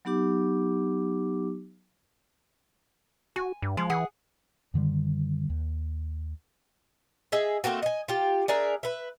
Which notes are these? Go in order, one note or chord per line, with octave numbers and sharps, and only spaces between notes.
F#3 B3 D#4 G4 D6
F#4 G#5
G2
F3 G#3
E3 G#4 F#5 G#5
F#2 D3 D#3 G3
D#2
G#4 D#5 E5
A3 A#3 C4 F#4
D#5 G#5
F4 G4
D4 G#4 A#4 E5
B4 E5